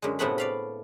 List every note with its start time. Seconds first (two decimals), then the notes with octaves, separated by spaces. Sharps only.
0.02 F#2 D3 G#3
0.19 A2 C3 A3 B3 F#5 B5
0.38 D5 F5 B5